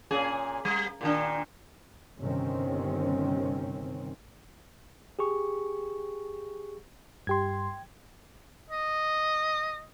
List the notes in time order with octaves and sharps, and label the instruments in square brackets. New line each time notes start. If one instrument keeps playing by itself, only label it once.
[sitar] A#2 C#4 G#4
G3
A#2 D#3 D4
[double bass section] G1 C3 D#3 C4 C#4
[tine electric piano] G4 G#4 C#6
[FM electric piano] G2 G4 C6 [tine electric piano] G5 G#6
[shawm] D#5